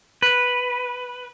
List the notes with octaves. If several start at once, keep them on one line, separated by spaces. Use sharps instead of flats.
B4